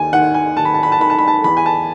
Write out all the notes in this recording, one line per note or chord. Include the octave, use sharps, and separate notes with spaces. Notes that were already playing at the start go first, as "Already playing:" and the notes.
Already playing: D#2 G#5
D#3 F#5
G#5
D#2 A5
B5
A5
B5
A5
D#3 B5
A5
B5
A5
E2 B5
G#5
A5